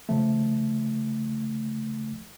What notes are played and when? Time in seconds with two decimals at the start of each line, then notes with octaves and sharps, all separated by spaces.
0.09 C#3 F3 A3